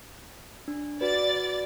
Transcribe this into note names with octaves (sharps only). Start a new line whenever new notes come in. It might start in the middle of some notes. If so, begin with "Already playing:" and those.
D4
F#4 B4 D5 A6